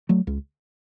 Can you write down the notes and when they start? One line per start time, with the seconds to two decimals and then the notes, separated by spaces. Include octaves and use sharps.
0.09 F#3 A3
0.27 C#2